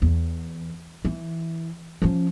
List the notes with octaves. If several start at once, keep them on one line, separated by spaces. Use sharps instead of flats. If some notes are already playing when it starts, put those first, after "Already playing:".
E2
E3
F3 C#4